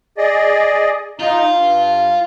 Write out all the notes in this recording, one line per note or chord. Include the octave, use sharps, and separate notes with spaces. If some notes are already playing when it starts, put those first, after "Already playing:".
G#4 D5 D#5
D#4 F4
G2